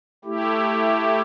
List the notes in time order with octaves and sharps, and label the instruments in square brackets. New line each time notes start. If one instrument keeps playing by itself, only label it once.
[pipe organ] A3 E4 G4